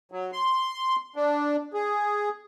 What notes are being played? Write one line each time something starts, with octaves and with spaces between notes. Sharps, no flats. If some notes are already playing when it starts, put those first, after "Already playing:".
F#3
C6
D4
G#4